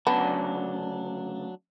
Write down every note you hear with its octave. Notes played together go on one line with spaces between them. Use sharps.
D2 C#3 F#3 B3 D4 A5